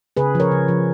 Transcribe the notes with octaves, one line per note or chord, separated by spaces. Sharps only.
C#3 G#4 B4
F3 A#4 C#5
C#3
F3